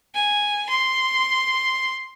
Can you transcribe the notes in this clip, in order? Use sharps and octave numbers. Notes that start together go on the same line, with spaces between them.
G#5
C6